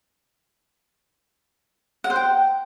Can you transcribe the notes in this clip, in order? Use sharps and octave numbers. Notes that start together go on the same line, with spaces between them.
F#5
C5
G5